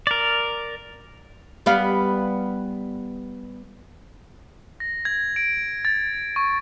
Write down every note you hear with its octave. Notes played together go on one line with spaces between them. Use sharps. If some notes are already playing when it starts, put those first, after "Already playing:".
A#4 D5
G3 B3 F5
A#6
G#6
D7
A6
C#6